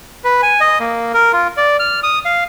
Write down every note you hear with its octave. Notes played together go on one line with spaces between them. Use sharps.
B4
G#5
D#5
A#3
A#4
F4
D5
F6
D#6
F5